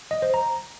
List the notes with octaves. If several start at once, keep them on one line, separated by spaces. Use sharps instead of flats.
D#5
C5
A#5